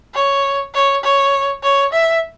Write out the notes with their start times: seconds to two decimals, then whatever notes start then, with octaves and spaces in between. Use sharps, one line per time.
0.14 C#5
0.74 C#5
1.03 C#5
1.63 C#5
1.92 E5